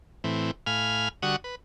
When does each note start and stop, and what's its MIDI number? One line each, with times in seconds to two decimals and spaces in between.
0.24 0.51 45
0.24 0.51 52
0.24 0.51 60
0.67 1.09 45
0.67 1.09 77
0.67 1.09 80
0.67 1.09 83
0.67 1.09 89
1.22 1.36 50
1.22 1.36 55
1.22 1.36 66
1.22 1.36 78
1.22 1.36 85
1.22 1.36 87
1.44 1.55 71